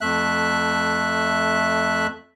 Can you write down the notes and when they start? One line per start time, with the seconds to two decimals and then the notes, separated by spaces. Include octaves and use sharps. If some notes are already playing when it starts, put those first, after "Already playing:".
0.01 F2 A3 E5 F#6